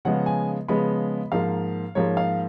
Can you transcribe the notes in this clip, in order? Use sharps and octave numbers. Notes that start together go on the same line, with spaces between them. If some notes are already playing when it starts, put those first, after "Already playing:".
C#3 F3 G#3 B3 F#5
G#5
C#3 F3 G#3 B3 B5
G#2 F3 A#3 F5
G#2 F3 A#3 C#5
F5